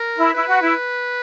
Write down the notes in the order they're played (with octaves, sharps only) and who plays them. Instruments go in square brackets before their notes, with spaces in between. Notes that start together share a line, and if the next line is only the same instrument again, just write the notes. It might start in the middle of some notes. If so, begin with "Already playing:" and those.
Already playing: [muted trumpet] A#4
[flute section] E4
[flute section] E4 [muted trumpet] B4
[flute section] F#4
E4